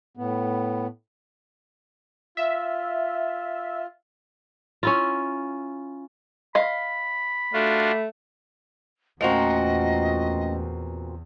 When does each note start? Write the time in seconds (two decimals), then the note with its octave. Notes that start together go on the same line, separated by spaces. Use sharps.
0.17 A2 B3
2.37 F4 E5
4.83 C#4 E4 F4
6.55 D#5 F5 B5
7.53 A3 D4 F4 F#4
9.21 E2 A#2 A3 C4 C#4 F#4 D#5 G5